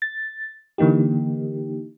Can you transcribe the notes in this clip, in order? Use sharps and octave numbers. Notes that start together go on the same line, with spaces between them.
A6
D3 E3 A#3 D#4 G4